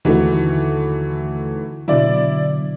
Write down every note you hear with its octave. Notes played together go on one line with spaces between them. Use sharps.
D#2 D3 E3 F#3 A3 D#4
B2 D3 F#3 E4 D5